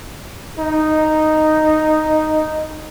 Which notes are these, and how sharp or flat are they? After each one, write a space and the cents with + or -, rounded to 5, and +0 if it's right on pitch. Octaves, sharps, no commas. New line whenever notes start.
D#4 -5